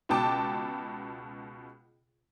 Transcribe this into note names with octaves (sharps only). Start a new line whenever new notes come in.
C#2 B2 G5 A5 D6